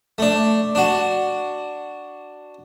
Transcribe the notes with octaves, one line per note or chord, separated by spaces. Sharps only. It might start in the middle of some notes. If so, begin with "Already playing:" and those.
A3 D4
D4 F#4